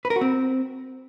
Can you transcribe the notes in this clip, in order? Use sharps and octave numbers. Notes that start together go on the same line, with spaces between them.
B4
A#4
F#4
C4